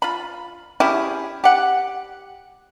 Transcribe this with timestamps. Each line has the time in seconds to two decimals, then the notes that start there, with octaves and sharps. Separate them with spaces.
0.02 F4 B5
0.80 C#4 E4 G4 G#4
1.44 G4 F#5